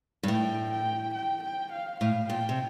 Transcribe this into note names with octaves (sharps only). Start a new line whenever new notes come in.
G2
A2 G5
G5
G5
G5
F5
A2 F5
A#2 G5
C3